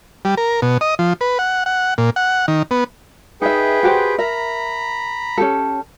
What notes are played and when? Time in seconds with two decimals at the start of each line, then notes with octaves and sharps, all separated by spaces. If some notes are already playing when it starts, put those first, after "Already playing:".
0.25 G3
0.37 A#4
0.62 B2
0.81 D#5
0.99 F3
1.21 B4
1.39 F#5
1.66 F#5
1.98 A#2
2.16 F#5
2.48 D#3
2.71 B3
3.42 D#4 G#4 B4 E5 G5
3.83 F#4 G4 C5
4.18 A#4 E5 A#5 B5
5.38 C#4 G4 A4